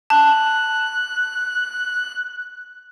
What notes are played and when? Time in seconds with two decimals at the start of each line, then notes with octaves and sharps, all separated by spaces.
0.10 A5 F#6